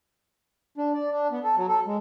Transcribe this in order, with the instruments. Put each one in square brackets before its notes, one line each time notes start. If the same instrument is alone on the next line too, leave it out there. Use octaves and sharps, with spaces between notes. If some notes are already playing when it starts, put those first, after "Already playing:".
[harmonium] D4
D5
D4
B3
A4
F#3
A4
G#3